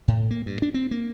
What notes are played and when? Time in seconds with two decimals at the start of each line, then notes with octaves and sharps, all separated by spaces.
0.08 A2
0.31 A#3
0.46 G2
0.62 D4
0.74 C4
0.91 A#3